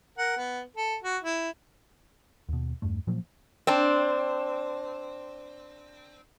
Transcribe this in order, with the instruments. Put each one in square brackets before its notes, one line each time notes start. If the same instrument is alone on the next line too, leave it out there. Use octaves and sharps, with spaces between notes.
[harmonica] A#4 F#5
B3
A4
F#4
E4
[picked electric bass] D#2 B2
E2 G2 A3
A#2 F3 F#3 A#3
[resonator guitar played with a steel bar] C4 D4